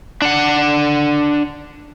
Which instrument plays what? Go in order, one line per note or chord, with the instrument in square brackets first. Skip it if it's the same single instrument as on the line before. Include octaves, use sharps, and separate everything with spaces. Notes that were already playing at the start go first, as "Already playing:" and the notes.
[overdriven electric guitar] D4 F#5